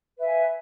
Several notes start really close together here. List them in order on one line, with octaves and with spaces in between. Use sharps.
B4 E5 F5 G#5